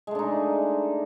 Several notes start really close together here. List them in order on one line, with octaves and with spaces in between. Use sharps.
G#3 A3 D4 D#4